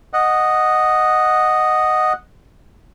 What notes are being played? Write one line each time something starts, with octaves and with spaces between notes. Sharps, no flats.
D#5 F#5